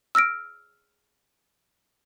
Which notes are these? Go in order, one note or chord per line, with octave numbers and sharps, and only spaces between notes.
E6 F6 A#6 D7